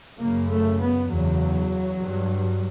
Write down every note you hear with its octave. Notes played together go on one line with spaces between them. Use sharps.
F#2 C#3 A#3
A3
B3
E2 C#3 F#3
G2